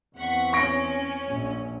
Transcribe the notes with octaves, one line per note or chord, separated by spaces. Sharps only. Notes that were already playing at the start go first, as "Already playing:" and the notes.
E2 C4 F#5 C#6 B6
C#4 C#6 A#6 D7
A#1